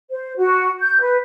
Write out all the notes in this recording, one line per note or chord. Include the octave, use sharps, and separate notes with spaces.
C5
F#4
G6
B4